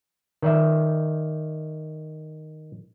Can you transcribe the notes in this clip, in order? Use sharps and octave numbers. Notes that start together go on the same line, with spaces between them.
D#3 D5 E5